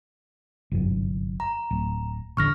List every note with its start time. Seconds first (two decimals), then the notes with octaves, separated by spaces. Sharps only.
0.72 G1 C2 F#2
1.40 A#5
1.71 D1
2.37 E1 A1 D3 C#6 F6 A#6